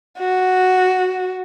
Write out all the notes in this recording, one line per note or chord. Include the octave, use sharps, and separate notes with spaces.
F#4